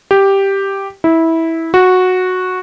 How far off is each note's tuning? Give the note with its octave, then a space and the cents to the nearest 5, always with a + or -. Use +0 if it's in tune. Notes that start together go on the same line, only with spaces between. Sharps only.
G4 +0
E4 -15
F#4 -10